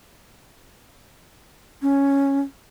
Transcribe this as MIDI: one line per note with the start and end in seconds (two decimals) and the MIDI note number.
1.82 2.40 61